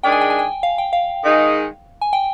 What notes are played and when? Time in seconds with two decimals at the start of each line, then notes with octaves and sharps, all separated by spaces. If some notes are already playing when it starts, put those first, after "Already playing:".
0.03 D#3 G#3 D4 G#4 G5
0.12 G#5
0.21 G5
0.30 G#5
0.39 G5
0.63 F5
0.78 G5
0.93 F5
1.23 D#3 G#3 D#4 G#4
2.01 G#5
2.13 G5